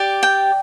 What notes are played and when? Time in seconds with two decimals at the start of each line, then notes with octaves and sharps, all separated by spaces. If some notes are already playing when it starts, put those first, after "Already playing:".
Already playing: G4 D5
0.23 G5